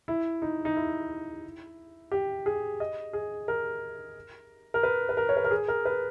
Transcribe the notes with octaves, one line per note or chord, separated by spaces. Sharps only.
E4
D#4
D#4
E4
G4
G#4
D#5
G#4
A#4
A#4
B4
B4
A#4
C#5
B4
A#4
G#4
A#4
B4